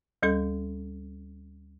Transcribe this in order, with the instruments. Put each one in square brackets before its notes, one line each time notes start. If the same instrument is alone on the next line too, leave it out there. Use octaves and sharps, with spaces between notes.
[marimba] D2 G3 C#4 A4